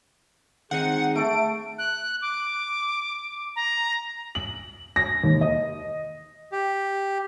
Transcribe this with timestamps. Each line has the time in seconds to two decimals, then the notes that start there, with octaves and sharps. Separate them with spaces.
0.71 D#3 C4 D#4 G#4 F#5
1.16 A3 A4 D7
1.78 F#6
2.22 D6
3.56 A#5
4.35 F#7
4.96 A#6
5.24 D#2
5.41 D#5
6.52 G4